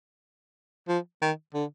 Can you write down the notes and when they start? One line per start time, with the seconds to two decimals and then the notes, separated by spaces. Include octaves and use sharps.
0.88 F3
1.22 D#3
1.55 D3